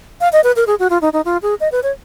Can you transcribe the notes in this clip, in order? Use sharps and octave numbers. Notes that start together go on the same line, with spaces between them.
F5
D#5
B4
A#4
G#4
F#4
F4
D#4
D#4
F4
G#4
D#5
B4
C#5